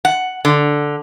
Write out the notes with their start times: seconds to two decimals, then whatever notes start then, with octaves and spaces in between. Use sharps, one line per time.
0.05 F#5
0.45 D3